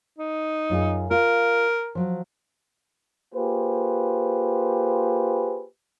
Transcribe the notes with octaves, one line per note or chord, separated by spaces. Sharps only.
D#4
F#2 F4 G#4
F4 A#4 F5
F3 F#3
A#3 F4 G4 G#4 B4 C5